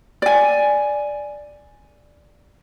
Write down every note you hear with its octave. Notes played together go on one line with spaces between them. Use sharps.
D5 G#5